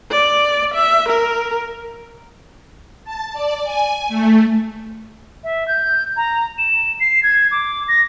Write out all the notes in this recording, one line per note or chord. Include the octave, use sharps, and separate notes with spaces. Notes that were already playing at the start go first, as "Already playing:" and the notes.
D5
E5
A#4
A5
D5
G#5
A3
E5
G6
A#5
E7
C7
G#6
D6
A#6